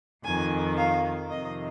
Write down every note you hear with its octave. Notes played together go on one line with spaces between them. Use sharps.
F2 D#3 G#5
F5
F2 C3 D#3 D#5